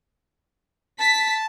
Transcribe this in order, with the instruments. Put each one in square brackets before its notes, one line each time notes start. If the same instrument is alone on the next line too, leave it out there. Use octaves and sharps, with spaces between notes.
[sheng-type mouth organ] A5 [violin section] B6